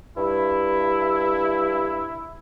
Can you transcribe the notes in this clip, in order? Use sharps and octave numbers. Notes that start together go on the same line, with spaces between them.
G2 E4